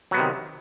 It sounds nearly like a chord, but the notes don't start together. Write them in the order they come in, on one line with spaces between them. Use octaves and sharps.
F#3 B3 C3 D#3